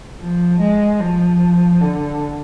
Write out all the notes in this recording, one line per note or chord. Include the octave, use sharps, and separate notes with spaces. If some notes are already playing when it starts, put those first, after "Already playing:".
F3
G#3
F3
D3